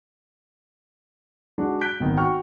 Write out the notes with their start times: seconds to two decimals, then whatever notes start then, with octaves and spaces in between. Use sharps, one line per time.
1.58 G#3 D4 F#4
1.81 F#6 G6 B6 D7
2.00 G#1 D#3 B3
2.17 F#4 G5 C#6 F6